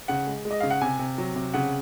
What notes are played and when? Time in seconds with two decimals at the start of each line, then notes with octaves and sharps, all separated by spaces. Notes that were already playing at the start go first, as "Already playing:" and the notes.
0.08 C#3 F#5
0.27 G#3
0.45 G#3
0.51 D#5
0.60 C#3 F5
0.70 F#5
0.81 C3 G#5
0.99 C3
1.18 F#3
1.36 C3
1.54 C#3 F#5